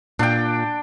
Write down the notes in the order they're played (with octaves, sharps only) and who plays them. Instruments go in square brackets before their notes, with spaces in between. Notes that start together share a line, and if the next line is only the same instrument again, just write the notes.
[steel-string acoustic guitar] A#2 [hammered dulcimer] D4 G5